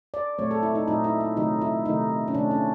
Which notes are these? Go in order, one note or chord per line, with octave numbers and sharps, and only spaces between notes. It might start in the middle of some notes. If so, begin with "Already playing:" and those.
D5
A#2 F#3 A3 C4 C#5
A4
E4
D#4
A#2 F#3 A3 C4 D#4
E4
E4
C3 D#3 F#3 A3 D#4
E4
C3 D#3 F#3 A3 D#4
C#4
C3 D#3 F#3 A3 D4
C#4